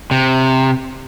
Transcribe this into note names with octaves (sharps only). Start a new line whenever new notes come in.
C3